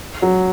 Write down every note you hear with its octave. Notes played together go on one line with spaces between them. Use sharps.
F#3